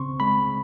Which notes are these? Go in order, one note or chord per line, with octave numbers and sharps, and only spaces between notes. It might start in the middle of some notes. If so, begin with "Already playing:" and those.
Already playing: C#3 C4 C6 C#6
G#3 B5